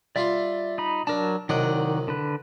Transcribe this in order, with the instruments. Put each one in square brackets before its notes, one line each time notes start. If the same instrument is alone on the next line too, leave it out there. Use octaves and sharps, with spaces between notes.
[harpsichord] G3 F4 C6 [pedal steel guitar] D5 E5
[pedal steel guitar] D#4 B5
[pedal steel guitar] F#3 A#4 A5 [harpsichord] D4
[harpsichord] C2 F#3 D#5 [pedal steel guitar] D#3 D5 F#5
[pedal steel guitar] D3 B4